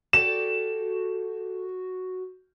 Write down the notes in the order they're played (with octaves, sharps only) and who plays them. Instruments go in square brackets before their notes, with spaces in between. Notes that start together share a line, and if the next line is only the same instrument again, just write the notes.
[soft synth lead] F#4 [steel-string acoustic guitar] G4 A4 D5 [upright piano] E7